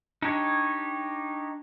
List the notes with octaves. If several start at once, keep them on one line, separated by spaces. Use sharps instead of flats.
D4 D#4 G4 C#5